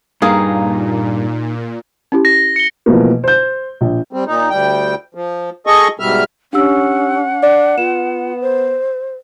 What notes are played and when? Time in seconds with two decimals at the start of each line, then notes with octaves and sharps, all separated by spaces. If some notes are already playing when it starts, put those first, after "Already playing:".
0.22 G2 A#2 A#3 D#4 G#4 F5
2.12 C#4 E4 G4
2.25 A#6
2.56 C#7 G7
2.86 B2 E3 F3 A3 A#3
3.24 C5 G6
3.81 A#1
4.13 G3 C4
4.27 A#2 D#4
4.50 D2 G3 G5
5.15 F3
5.67 G#4 A4 D#5 C#6
6.00 G#2 B2 G3 E5 F6
6.53 C#4 D4 G4 F#5 E6
7.43 D4 D5
7.78 B3 F4 E7
8.41 C5